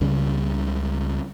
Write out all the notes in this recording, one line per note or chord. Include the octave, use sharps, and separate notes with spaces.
C#2 C#3 G3